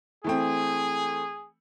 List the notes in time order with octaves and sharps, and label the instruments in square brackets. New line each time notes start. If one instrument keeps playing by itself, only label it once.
[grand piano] E3 A3 C4 [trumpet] G#4